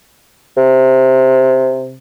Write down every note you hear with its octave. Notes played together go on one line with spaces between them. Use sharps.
C3